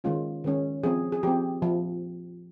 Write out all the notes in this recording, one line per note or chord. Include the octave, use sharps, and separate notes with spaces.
D#3 G#3 C#4 F4
D#3 G#3 C#4
F3 C4 G#4
G#4
F3 C4 G4
F3